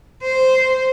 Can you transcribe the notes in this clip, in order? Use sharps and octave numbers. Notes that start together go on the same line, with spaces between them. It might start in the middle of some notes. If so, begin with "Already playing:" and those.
C5